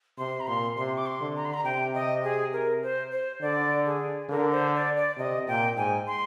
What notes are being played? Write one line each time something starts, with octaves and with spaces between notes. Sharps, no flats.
C3 C6
A#5
A#2 C6
C3 C6
D6
C6
D3
A#5
C6
A#5
C3 G5
D#5
G#4
A#4
C5
C5
D3 D5
G#4
D3 A#4
C5
D5
D5
C3 D#5
A#2 G5
G#2 G#5
C6